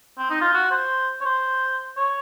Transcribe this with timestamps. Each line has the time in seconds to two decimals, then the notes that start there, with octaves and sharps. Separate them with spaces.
0.18 C4
0.30 D#4
0.41 F4
0.54 F#4
0.71 C5
1.21 C#5
1.25 C5
1.97 C#5